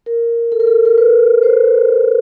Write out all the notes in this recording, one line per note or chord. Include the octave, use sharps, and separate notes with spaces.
A#4
A4
A#4
A4
A#4
B4
C5